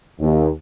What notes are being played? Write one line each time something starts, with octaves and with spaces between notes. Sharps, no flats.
D#2